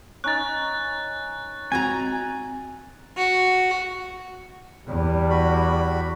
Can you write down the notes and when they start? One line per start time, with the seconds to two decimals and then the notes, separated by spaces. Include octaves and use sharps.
0.24 C#4 D#4 F#6 A6
1.72 C4 F#4 G#5 A#5
3.17 F#4
4.87 E2 G3
5.30 F#4 B5